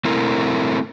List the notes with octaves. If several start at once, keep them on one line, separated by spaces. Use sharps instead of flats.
A3 C4 E4 A#4